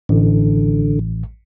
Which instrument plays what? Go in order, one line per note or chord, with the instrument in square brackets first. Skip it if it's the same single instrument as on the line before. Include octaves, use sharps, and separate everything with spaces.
[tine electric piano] A1 [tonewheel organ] D3